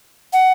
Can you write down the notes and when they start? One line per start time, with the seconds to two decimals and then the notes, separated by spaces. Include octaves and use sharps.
0.33 F#5